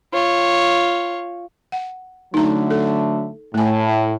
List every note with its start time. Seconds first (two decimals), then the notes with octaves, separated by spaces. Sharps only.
0.13 F4 C#5
1.72 F#5
2.34 D3 F#3 A3 D#4 A#5
2.70 A4
3.54 A2 A3 G#5